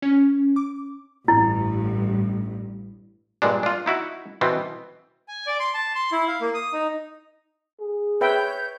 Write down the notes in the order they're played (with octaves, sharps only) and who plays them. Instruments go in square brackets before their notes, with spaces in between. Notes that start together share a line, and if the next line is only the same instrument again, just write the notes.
[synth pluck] C#4
D6
[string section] A1 G2 [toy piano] E4
[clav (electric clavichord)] G2 A#2 G#3 D4
D4 F4
D#4 E4 F#4
B2 E3 B3 C4
[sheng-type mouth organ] G#5
D5
C6
A5
C6
E4
F5
A#3
D#6
D#4
[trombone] G#4
[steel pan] B4 E5 G5 [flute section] C#5 G6